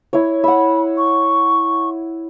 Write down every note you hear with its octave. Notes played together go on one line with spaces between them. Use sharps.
E4 C#5
E5 F#5 B5
C#6